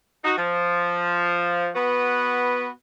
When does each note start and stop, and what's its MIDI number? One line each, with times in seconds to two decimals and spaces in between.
0.24 0.34 63
0.24 0.34 66
0.38 1.68 53
1.75 2.68 59
1.75 2.68 66
1.75 2.68 71